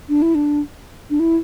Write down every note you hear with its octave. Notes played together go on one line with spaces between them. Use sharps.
D4
E4
D4
D4
E4